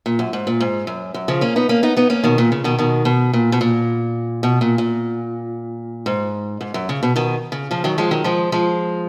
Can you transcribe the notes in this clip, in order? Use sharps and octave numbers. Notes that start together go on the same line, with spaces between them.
A#2
F#2
G#2
A#2
G#2
F#2
F#2
C#3 F3
A#3 C#4
B3 D#4
A#3 C#4
B3 D#4
B3 D#4
A#3 C#4
B2 D#3
A#2
C#3
B2 D#3
B2 D#3
B2
A#2
B2
A#2
B2
A#2
A#2
G#2
G#2
F#2
C#3
B2
B2 D#3
C#3
C#3 F3
D#3 F#3
F3 G#3
D#3 F#3
F3 G#3
F3 G#3